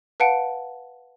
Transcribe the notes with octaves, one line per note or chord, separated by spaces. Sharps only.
B4 F5 F#5 A5 C#7 D7